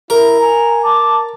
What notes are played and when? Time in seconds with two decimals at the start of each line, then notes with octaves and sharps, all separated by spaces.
0.10 E4 A#4
0.40 G#5 A#5
0.84 A5 D6